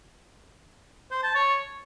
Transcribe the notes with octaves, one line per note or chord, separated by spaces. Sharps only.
C5
A5
C#5